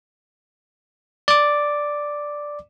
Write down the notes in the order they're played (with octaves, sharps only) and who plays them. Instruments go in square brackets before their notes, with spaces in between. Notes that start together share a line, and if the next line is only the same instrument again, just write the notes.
[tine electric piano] D5 D6